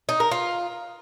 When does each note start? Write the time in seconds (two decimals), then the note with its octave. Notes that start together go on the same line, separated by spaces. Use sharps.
0.09 D#4
0.20 A#4
0.31 F4